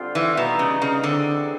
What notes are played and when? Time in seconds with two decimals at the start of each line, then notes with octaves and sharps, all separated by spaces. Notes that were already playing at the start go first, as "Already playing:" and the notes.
Already playing: D3 G3 C4 F4
0.15 E3
0.37 B2 G3 B3 D#4
0.59 C#3
0.82 C#3
1.04 D3 E3 G#3 C4